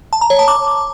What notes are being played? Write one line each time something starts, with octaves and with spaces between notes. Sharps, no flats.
A5
A#5
C#5
A5
D6